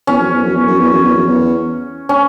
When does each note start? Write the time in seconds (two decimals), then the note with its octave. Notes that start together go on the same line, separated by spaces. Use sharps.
0.07 E2 C#4
0.19 F#2
0.31 E2
0.43 F#2
0.55 E2
0.67 F#2
0.80 E2
0.91 F#2
1.04 E2
1.15 F#2
1.27 E2
2.09 C#4